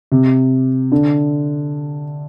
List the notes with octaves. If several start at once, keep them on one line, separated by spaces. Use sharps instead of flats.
C3
D3